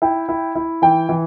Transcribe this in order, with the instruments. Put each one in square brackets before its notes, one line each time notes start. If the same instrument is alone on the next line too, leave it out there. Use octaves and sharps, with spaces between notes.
[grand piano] E4 [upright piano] G5
[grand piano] E4
E4
[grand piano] E3 [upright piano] G5
[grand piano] E3